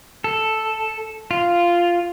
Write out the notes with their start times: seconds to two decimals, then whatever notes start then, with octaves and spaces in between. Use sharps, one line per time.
0.24 A4
1.31 F4